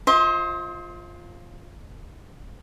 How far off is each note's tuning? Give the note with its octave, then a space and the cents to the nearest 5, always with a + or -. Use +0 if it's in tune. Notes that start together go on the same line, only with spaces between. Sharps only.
F4 +0 C5 +25 D#5 +45